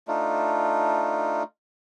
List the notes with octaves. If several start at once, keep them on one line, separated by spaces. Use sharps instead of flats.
A3 D4 D#4 F4